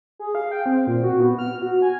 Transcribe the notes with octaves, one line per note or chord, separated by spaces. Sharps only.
G#4
F5
G5
C4
A#2
F#4
B3
F6
F#4
G#5